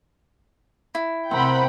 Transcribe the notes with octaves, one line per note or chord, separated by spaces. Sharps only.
E4
C3 C4 A#4 F#5 G5 B5